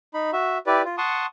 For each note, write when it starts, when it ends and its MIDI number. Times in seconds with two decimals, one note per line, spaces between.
0.14 0.31 63
0.14 0.31 83
0.33 0.58 66
0.33 0.58 76
0.67 0.82 64
0.67 0.82 67
0.67 0.82 71
0.67 0.82 74
0.85 0.96 65
0.98 1.26 78
0.98 1.26 81
0.98 1.26 84
0.98 1.26 85
0.98 1.26 87